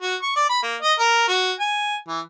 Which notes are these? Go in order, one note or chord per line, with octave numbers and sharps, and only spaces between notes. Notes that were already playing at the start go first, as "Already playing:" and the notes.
F#4
C#6
D5
B5
A#3
D#5
A#4
F#4
G#5
E3